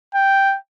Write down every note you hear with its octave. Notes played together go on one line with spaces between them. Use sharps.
G5